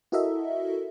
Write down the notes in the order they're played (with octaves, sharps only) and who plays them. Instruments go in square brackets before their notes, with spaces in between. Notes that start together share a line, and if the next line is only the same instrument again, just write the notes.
[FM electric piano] E4 F#4 A4 A#4 D#5 E5